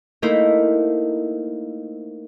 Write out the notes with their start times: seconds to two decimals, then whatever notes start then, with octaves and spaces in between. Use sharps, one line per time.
0.22 A3 A#3 D#4 E4 C5